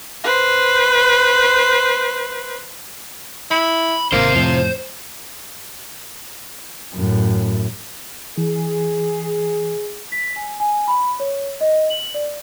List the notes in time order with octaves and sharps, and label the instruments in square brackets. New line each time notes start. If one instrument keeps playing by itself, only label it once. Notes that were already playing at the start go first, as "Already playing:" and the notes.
[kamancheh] B4 C5
[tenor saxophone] E4 [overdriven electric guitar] B5
[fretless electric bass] G#1 [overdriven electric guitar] C3 [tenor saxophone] A#3 [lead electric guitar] C5
[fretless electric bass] F2 A2 [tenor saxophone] F3
[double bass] F#2 A2
[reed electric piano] E3 [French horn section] G#4
[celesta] B6
G#5
G#5
B5
C#5
D#5
F#7
D5